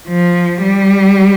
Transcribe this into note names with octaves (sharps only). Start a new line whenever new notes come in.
F3
G3